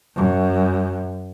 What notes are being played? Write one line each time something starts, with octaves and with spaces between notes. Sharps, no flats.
F#2